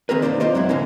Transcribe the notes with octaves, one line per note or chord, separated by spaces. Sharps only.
D#3 C4 G#4 A#4 B4
G2 C3 A#3 D#4 C5 D5
B1 C4 F4 C5 D5 D#5
F#2 F#3 G#3 C4 E4
F2 A2 D3 A#3 C#4